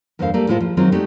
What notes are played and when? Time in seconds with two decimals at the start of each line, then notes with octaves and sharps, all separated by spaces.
0.19 E2 G2 D3 A#3 C5 F5
0.34 G3 A3 A#3
0.48 A2 G#3 E4 F4 C5
0.60 F3
0.77 D#3 F#3 G#3 C4 F4
0.92 G#3 A3 D4 D#4 F#4 G4